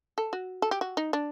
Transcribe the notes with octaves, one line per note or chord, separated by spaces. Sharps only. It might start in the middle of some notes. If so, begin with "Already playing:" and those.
A4
F#4
A4
G4
F#4
D#4
D4